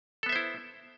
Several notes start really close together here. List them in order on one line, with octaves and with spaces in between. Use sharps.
A4 B3 E5 C5 E4